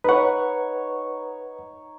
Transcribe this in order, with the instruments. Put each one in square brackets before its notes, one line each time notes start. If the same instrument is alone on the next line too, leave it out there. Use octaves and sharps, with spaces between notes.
[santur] D#4 C#5 [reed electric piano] B4 F#5